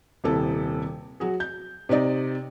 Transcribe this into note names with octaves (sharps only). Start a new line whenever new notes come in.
D#1 C3 E4 A4
F#3 F#4 G#4
G6
C3 C4 D#4 D5 D#5